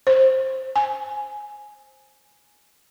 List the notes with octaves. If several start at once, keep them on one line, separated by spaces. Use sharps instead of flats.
C5
G#5